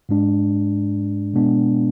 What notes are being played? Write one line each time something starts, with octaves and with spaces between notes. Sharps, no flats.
G#2 G#3 D4
B2 G#3 B3 D4